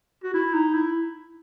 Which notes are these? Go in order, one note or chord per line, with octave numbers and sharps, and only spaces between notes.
F#4
E4
D#4
E4